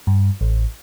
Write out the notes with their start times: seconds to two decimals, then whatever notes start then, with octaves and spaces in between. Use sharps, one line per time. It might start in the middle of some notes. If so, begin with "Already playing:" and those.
0.07 G2
0.41 A1